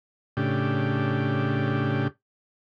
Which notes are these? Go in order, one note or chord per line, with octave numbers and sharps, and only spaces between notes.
A2 C#3 D4 G4